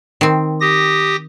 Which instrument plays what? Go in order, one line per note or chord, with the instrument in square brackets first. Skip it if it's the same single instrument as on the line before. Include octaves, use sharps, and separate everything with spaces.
[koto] D#3 C4
[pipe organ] G4 D#6 A#6